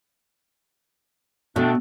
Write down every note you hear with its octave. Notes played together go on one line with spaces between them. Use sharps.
B2 A3 C4 D4